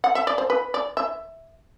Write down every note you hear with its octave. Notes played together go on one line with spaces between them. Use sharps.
F#5
E5
D5
C5
B4
D5
E5